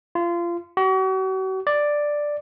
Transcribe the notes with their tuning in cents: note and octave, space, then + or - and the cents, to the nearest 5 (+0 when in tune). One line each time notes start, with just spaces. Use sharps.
F4 -25
F#4 +40
D5 +5